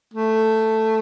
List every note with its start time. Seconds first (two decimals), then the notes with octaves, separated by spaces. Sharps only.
0.14 A3